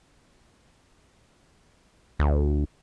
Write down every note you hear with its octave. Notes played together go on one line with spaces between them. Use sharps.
D2